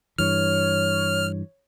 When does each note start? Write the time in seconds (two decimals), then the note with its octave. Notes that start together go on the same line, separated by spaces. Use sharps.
0.18 G2 E3 C#5 F6